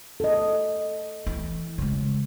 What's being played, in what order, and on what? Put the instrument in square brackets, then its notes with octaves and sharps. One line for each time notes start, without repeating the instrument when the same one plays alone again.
[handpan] A4 D#5
[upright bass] E3
C#3 G#3